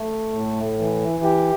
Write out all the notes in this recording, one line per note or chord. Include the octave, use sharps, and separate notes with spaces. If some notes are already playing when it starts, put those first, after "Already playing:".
Already playing: A3
A2
E3
G4